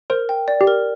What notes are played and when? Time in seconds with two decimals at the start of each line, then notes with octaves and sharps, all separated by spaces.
0.10 A#4 C5
0.29 G5
0.48 D5
0.61 G4
0.67 A#4